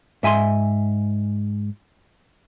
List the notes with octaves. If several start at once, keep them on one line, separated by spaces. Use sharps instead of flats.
G#2 E5 G#5 B5 C6